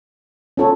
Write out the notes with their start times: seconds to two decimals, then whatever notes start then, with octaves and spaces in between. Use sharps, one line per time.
0.57 C#4 F4 A4 C#5